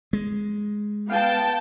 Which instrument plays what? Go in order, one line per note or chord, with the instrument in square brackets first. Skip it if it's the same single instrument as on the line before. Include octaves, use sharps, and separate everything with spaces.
[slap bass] G#3
[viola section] B3 G5 A5 [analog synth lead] F5